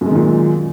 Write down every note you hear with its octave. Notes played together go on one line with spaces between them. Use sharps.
F#2 A#2 D#3 G#3